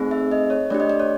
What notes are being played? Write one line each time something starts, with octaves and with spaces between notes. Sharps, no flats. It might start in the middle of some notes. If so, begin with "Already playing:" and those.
Already playing: A3 C4 D#4 G#4
E5
D#5
C#5
A3 D4 G4 D5
D#5
D5
C#5